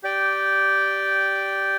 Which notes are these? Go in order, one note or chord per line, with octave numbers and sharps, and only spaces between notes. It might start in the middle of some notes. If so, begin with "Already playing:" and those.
G4 D5 G5